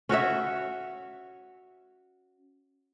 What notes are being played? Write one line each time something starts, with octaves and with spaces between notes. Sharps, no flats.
C#4 F#4 C#5 E5